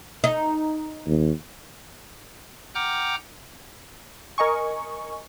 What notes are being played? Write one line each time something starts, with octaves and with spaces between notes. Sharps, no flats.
D#4
D#2
F#5 G5 A#5 D6 F6 G6
A#4 D#5 G#5 C#6